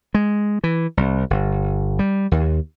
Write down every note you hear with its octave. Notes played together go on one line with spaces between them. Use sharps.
G#3
E3
C2
G1
G3
D#2